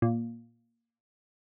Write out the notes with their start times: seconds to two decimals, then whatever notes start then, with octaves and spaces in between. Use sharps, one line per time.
0.02 A#2